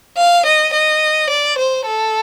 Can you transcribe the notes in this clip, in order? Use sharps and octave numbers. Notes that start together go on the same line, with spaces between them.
F5
D#5
D#5
D5
C5
A4